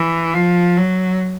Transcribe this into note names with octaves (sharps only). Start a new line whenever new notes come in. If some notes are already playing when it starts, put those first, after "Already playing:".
Already playing: E3
F3
F#3